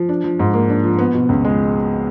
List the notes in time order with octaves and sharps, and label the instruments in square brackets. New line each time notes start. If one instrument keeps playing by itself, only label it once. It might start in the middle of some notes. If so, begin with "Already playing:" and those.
Already playing: [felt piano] F3
D4
F3
G#2
A#3
D4
F3
B3
B2
C#2
G#3